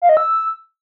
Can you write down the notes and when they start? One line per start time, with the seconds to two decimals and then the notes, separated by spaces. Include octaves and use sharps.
0.02 F5
0.09 D#5
0.17 E6